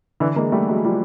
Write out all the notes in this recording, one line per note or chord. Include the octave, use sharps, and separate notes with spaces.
D3 E3
G#3 A#3
G3 A3
F#3 G#3
F3 G3